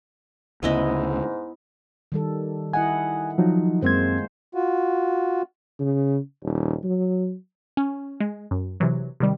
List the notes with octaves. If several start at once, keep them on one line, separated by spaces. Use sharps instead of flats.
D2 G#2 C#3 B3 E4 D#5
D#3 G3 A4
E4 D#5 F#5 G#5
F3 F#3 D#4
F#2 G#3 A#3 C4 C5 G#6
F4 F#4
C#3
D#1
F#3
C#4
G#3
F#2
C3 E3 F#3
C3 D#3 G3